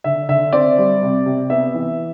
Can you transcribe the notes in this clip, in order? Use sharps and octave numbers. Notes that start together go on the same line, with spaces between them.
D3 E5
D3 E5
C4 D5
G3
C3
C3
B3 E5
E3